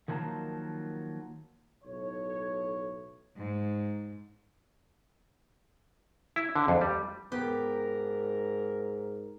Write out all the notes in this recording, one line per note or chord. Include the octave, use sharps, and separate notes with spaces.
D#3 F3 F#3 A#3 D#4 A5
B1 A2 C#5
G#2
E4
D3
F2
G3
G#2 B3 G4 A#4